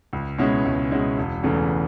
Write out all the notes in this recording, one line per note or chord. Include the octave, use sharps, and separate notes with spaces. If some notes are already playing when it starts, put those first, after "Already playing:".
C#2
B2 G#3 C#4 E4
C#2
B2 G#3 C#4 E4
E1
E2 C#3 E3 A3